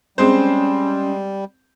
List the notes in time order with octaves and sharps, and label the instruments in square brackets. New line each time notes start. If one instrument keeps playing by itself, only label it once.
[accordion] G3 [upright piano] G#3 C4 C5 [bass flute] C#4